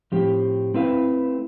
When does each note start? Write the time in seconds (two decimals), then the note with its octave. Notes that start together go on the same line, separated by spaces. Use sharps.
0.12 A2 F3 C4 G4
0.74 A3 C4 E4 B4 F5